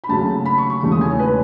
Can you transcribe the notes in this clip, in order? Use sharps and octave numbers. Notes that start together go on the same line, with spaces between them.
B5
D#2 C#3 F#3 A3 A5
B5
C#6
C#6
E1 D#2 C#3 E3 A3
D#6
G#5
C#5
B4